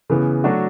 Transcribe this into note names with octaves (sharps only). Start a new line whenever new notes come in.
C#3 E3 B3
F#3 A3 D4 F#4